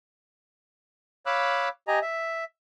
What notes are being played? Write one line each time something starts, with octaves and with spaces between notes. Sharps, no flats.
C#5 F5 B5 D6 E6 F#6
G4 D#5 G#5 A#5
E5